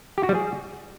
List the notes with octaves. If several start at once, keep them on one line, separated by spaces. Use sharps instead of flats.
G4
F#4
G3
G#4